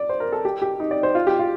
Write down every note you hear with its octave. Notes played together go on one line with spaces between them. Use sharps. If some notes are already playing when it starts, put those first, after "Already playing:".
Already playing: D5
C5
A#4
A4
G4
G4
D#4
D5
C5
F4
G4
F4